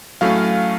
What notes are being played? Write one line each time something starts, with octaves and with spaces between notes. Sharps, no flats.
A2 F#3 A3 C#4 F5